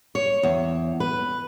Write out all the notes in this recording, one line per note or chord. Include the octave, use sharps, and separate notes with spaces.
C#5
E2
B4